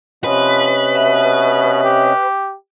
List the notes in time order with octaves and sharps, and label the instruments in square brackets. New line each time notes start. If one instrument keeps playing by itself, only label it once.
[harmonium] C3 C#4 D#5 [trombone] F3 [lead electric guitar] B4
[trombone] B2 [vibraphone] E5
[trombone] G4